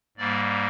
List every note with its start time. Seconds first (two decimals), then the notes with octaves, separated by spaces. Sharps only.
0.17 G#2 G3 A#3 D5